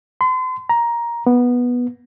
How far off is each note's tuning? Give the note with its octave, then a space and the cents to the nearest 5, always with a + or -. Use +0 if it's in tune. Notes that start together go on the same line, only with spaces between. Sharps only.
C6 -40
A#5 +10
B3 -10